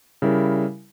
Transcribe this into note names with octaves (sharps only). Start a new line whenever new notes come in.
C#3 G3 E4 A#4